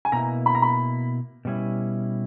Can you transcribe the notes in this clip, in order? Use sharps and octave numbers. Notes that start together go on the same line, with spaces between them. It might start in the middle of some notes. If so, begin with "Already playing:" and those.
G#5
B2 A#3 E4 A#5
B5
A#5
B5
B2 G3 C#4 E4